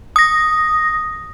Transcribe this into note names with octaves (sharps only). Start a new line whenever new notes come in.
D#6 A#6